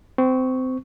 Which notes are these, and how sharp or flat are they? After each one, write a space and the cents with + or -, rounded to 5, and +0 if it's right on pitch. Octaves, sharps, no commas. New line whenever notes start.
C4 -20 C#6 +0